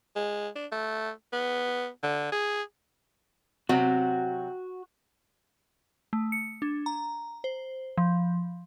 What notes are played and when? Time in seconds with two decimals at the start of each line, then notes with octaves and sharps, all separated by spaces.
0.16 G#3
0.56 D4
0.72 A3
1.33 B3
2.03 D3
2.32 G#4
3.69 C3 F#3 C4 F#4
6.13 A3
6.32 C#7
6.62 D4
6.86 A#5
7.44 C5
7.97 F3